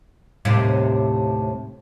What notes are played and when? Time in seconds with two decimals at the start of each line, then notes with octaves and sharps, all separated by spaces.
0.45 D#2 A2 C3